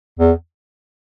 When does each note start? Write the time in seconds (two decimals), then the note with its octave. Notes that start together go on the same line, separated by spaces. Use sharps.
0.19 E2